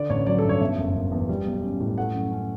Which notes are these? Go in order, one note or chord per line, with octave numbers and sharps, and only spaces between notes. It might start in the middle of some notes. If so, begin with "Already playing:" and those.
Already playing: D3 D5
A1 C#5
F#3 D5
A4
G2
C#5
B2 E5
F#1
F#1
E2
G3
B1
C#4
A2
A3 F#5
F#2
C#4